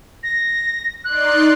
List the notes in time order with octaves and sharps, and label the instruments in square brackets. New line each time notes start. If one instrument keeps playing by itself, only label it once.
[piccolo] A#6
[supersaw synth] D#4 D5 C6 [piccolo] F#6